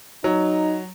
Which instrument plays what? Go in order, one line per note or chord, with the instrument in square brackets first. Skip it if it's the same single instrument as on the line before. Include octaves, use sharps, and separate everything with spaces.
[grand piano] F#3 [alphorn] D#4